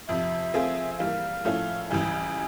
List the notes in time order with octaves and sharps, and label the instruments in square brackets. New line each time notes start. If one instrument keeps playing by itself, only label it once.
[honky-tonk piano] F2 C3 F3 [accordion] E5
[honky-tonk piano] F3 A3 C4 F4 G#4
[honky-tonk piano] E3 G3 A#3 [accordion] F5
[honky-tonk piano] A2 F3 A3 C#4 E4
[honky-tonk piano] C#2 C#3 E3 G3 [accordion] G#5